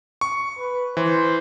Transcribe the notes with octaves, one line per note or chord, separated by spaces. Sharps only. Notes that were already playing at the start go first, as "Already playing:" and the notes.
C#6
B4
E3 C5